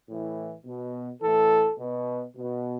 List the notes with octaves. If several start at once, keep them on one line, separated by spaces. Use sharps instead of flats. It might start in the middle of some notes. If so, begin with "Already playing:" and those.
A2 E3
B2
A2 E3 A4
B2
B2